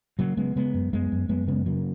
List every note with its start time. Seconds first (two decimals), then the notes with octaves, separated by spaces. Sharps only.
0.19 C#3 F#3 A#3
0.37 C#3 G#3 B3
0.56 C#3 G#3 B3
0.74 F#2
0.93 F#2 G#3 B3
1.12 F#2
1.29 F#2 G#3 B3
1.48 C#3 G#3 B3
1.66 C#3 F#3 A#3